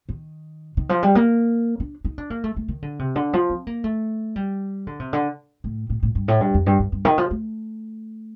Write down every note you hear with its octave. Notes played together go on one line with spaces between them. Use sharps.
D#3
D#3
F3
G3
A#3
D4
D#4
D4
A#3
A3
A3
D#3
D3
C3
D3
F3
C4
A#3
A3
G3
D3
C3
D3
A2
A2
A2
G2
A2
G2
F2
G2
G2
G2
D#3
F3
A3